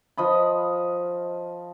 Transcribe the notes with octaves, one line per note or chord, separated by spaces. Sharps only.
F3 D#5 B5